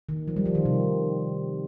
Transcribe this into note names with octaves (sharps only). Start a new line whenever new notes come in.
D#3
F3
G3
F3
D#3
C3